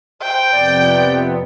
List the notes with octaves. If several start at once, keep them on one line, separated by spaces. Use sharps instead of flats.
C5 G5
F2 C3 B3 D5